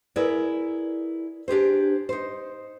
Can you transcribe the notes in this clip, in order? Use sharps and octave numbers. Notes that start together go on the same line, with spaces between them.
E4 G#4 A#4 B4 D5
D4 G4 G#4 C5
D#4 C5